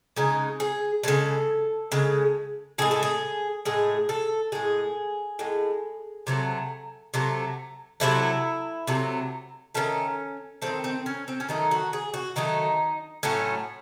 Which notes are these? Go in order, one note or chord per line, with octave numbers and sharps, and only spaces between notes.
C#3 G#3 D#4
G#4
C#3 G#3 A4
C#3 G#3
A2 G#3 G#4
A4
G#4
A2 G#3 G#4
A4
A2 G#3 G#4
A2 G#3
C3 F#3 A3
C3 F#3 A3
C3 F#3 A3 E4
C3 F#3 A3
D#3 F#3 A3 C#4
D#3 F#3 A3 C4
C4
C#4
C4
C#4
D#3 F#3 A3 D#4
F#4
G#4
F#4
D#3 F#3 A3 D#4
A2 F#3 A3 C#4